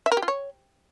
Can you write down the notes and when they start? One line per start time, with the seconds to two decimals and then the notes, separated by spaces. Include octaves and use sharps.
0.06 E5
0.12 A#4
0.17 G4
0.22 F4
0.28 C#5